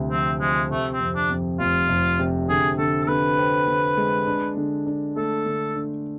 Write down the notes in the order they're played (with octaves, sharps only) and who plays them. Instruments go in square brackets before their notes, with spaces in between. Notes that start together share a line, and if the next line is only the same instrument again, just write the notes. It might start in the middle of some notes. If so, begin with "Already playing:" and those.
Already playing: [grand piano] D2 C3 F3
[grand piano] F3 [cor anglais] C4
[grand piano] F3 [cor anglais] G#3
[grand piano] C3 [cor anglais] A3
[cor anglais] C4
[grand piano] F2
[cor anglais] D4
[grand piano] F2
[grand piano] F1 [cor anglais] F4
[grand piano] F1
C3
[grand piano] D3 [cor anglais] G#4
[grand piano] D3 [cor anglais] A4
[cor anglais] A4
[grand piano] D3 [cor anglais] B4
[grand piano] C4
D3
G#3
D4
D3
D4
[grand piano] A3 [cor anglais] A4
[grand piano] D3
D4